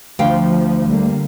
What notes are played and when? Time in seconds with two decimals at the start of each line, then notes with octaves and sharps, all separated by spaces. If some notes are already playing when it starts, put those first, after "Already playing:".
0.19 D2 F3 F5 G5
0.89 D3 G3 A#3